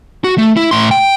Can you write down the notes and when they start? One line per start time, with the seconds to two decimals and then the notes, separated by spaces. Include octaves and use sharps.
0.24 F#4
0.38 A3
0.57 E4
0.71 A2 C6
0.91 G5